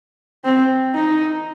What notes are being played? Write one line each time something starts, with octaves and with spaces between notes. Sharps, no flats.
C4
D#4